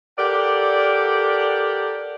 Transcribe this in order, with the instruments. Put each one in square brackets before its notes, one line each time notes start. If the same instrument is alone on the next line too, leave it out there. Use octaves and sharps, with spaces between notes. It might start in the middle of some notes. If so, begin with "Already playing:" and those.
[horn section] G4 A4 A#4 D5 F#5